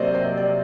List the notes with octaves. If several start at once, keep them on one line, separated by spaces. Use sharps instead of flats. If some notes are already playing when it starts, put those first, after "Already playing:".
Already playing: C3 F#3 A#3 C5 D5 D#5
C5
D5